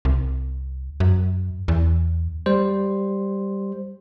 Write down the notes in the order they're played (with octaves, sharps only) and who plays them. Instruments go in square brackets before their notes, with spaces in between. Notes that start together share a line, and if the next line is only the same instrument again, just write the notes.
[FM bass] C2
F#2
E2
[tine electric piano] G3 C5